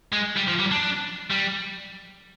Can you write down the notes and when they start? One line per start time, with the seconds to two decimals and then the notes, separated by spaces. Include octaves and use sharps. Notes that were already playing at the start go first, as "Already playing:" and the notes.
0.13 G#3
0.37 G3
0.48 F3
0.60 G3
0.72 D4
1.31 G3